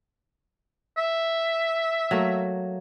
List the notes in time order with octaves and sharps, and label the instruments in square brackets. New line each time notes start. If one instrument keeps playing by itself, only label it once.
[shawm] E5
[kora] F#3 A3 A#3